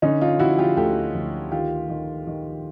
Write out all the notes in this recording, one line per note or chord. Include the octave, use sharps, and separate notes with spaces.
D3 C#4 D#4
D#4 F4
D3 E4 F#4
F4 G4
D2 G4 A4
D2
D#3 F4 G4
D#3
D#3